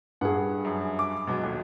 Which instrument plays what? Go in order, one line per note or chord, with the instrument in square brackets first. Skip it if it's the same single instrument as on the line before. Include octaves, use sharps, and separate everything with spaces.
[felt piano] G2 G#4 [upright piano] F#5
[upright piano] F#2
D6
B2 F#3 G#3
D#1